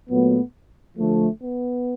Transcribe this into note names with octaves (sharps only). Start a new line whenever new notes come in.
A#2 F#3 A3 B3
D3 F3 A3
B3